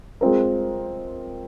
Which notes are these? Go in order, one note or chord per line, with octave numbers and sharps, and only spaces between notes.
G#3 C4 F4 A#4